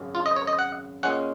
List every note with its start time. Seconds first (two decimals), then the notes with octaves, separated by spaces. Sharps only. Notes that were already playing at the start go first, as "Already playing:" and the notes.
Already playing: G#1 F#2 C#3
0.15 F4
0.26 D#5
0.36 C#5
0.47 D#5
0.59 F#5
1.03 A#2 G#3 C#4 F#5